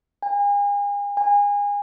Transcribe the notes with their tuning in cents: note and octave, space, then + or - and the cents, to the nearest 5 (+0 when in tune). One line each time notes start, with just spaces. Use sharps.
G#5 -40
G#5 -30